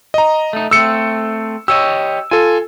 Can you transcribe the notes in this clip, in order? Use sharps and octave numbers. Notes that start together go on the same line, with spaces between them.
D#5 A#5
A3 D#4
A3 C4 E6 C#7
G4 C#5 D#5 E6
F4 A4 G#5